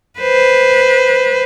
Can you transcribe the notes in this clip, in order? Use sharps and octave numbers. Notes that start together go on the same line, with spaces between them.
B4 C5